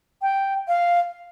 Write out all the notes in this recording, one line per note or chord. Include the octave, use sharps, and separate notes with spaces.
G5
F5